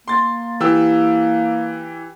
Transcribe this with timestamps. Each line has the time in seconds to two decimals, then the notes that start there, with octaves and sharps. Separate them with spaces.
0.08 A#3 C6 A6
0.60 E3 G4 E6